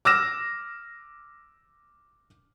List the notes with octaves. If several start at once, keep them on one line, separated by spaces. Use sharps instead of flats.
D6 E6 F6 A#6 E7